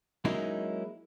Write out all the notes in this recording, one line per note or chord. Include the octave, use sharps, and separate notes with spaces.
F#3 G#3 A#3 C#4 D#4 E4